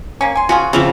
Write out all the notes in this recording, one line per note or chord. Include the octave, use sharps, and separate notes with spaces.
A#3 C#4
G#5 C6
C#4 F4 F#4 G#4
C#3 E3 F3 C4